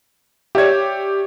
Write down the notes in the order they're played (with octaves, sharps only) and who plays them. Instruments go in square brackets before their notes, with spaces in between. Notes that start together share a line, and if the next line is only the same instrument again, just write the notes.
[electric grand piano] G4 G#6 [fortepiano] C#5 D5 E5